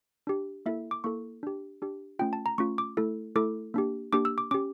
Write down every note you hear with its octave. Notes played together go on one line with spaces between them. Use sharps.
D4 G4
A#3 E4 A4 E5
D6
A#3 E4 A4 C#6
D4 G4
D4 G4
A3 C#4 F4 G5
A5
A#5
A3 C#4 F4 C#6
D6
A3 E4 A4
A3 E4 A4 D6
A#3 D4 G4
A#3 D4 G4 D6
E6
D6
C#4 G4 D6